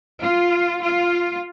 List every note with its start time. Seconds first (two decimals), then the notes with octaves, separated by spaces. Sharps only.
0.22 F4
0.83 F4